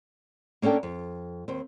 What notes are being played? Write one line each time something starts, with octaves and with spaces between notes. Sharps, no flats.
A#3 C#4 D4 A4 G5
F2
D#2 C4